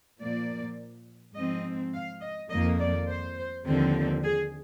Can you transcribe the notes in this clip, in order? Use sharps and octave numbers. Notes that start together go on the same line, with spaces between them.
A#2 F3 A#3 D5
G#2 F3 C4 D#5
F5
D#5
F2 D#3 A#3 D#5
D5
C5
D#2 D3 F3 C4
G#4